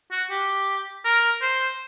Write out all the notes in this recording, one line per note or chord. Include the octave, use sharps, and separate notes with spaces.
F#4
G4
A#4
C5